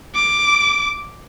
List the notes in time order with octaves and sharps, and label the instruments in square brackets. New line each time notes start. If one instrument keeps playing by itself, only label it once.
[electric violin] D6